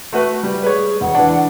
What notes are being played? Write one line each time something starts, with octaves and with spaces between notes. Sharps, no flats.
A3 F#4 B4
G3
G#4 B4 C#5
E1 F#5
E3 D4